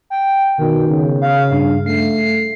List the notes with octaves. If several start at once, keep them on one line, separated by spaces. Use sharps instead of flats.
G5
B2 D#3
C#3
F5
G2
A3 C7